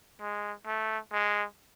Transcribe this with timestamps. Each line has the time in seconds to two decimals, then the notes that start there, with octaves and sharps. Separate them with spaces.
0.21 G#3
0.67 A3
1.12 G#3